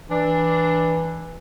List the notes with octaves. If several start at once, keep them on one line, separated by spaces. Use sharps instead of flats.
E3 D4